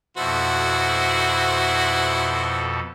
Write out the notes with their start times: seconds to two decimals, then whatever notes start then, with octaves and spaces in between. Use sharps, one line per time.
0.17 F2 B2 E4 F#4 A4 C5